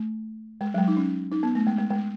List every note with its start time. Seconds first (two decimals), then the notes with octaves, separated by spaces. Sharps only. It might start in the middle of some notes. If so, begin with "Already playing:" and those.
Already playing: A3
0.61 G#3
0.74 F#3
0.78 G#3
0.88 D#4
0.97 C#4
1.32 D#4
1.43 B3
1.55 A3
1.67 G#3
1.79 G#3
1.90 G#3